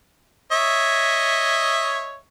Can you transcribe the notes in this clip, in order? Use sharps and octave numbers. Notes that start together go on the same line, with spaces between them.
C#5 D#5 E5